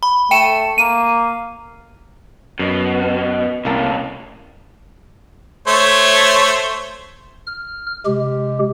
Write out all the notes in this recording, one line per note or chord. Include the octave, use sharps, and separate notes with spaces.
B5
A3 G5 C#7 E7
A#3 D#7
F#2 B2
C2 A2 C#3 A#3 A5
A3 C5 C#5
F6
C3 G#3 G4